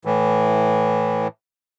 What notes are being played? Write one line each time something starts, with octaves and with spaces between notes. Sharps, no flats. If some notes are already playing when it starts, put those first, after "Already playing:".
A2 E3